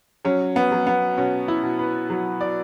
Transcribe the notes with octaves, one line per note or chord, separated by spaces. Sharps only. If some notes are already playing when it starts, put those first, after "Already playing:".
F#3 C#4
B3
F#3
B3
B2 C#4
E4
B2
B4
F#3
D5